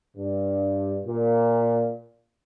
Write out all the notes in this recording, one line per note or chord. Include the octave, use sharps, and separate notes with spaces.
G2
A#2